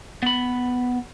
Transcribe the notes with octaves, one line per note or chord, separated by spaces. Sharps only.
B3 B5